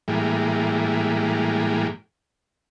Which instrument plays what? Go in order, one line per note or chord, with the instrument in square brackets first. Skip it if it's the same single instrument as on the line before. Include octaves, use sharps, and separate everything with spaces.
[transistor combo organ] A2 E3 G3 G#3 A#3